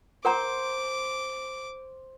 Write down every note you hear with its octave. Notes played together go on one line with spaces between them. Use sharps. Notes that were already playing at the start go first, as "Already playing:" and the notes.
A#4 C5 F#5 A#5 D6